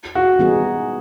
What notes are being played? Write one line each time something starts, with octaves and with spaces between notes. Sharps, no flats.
F#4
E3 G3 B3 D#4 G#4